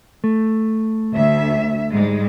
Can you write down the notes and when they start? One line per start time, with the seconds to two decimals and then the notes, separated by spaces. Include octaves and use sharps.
0.24 A3
1.15 D2 E5
1.93 G#2 G3 G#3